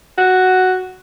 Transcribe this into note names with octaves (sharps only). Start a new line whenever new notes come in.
F#4